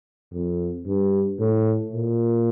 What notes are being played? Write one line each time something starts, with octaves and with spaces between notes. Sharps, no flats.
F2
G2
A2
A#2